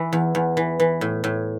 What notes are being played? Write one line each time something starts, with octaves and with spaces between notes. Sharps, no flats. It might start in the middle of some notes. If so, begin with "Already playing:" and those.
Already playing: E3
E2
E2
E3
E3
A2
A2